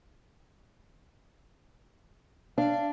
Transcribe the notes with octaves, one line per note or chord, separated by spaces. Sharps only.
D4 F5